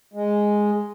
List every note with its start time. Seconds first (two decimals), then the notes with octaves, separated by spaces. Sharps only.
0.14 G#3